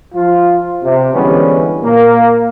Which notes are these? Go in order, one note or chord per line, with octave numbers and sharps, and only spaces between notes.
F3 F4
C3
D3 E3 G3 G#3 B3 C#4
A#2 A#3